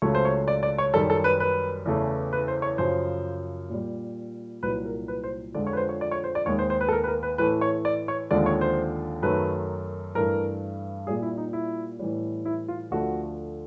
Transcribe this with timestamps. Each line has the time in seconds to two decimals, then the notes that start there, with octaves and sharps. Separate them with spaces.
0.02 C#2 C#3 F#3 A3 C#5
0.15 C5
0.25 C#5
0.48 D5
0.63 D5
0.78 C#5
0.94 F#2 D#3 G3 A4
1.10 A4
1.24 B4
1.40 B4
1.86 E2 C#3 E3 A3
2.33 B4
2.48 C5
2.62 C#5
2.78 F#2 C#3 F3 C5
3.70 A#2 G3
4.63 C2 A#2 F#3 B4
4.85 A#4
5.08 B4
5.24 C5
5.55 F2 D3 F3 G#3 D5
5.67 C#5
5.73 B4
5.77 C5
5.89 C#5
6.01 D5
6.11 C#5
6.24 C5
6.35 D5
6.46 D#2 D#3 G#3 C#5
6.59 C5
6.70 C5
6.81 B4
6.89 A4
6.93 A#4
7.04 B4
7.08 A#4
7.23 B4
7.38 A2 E3 A3 B4
7.61 C#5
7.85 D5
8.08 C#5
8.31 D#2 D3 F3 G#3 D5
8.46 C#5
8.61 C5
9.22 F#2 D#3 F#3 A3 B4
10.15 G2 E3 A3 A#4
11.07 A#2 G3 G#4
11.22 E4
11.37 D#4
11.53 E4
11.99 A2 E3 G3
12.45 E4
12.68 F4
12.91 D2 D3 F3 A3 F#4